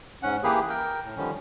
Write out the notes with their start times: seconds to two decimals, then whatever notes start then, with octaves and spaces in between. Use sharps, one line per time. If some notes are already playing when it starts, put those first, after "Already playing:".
0.23 G#2 C#4 F#5
0.43 E3 A#3 G4 G#4 B4
0.69 A#4 G5
1.04 A2
1.17 D3 D#3 F3 G3 C#4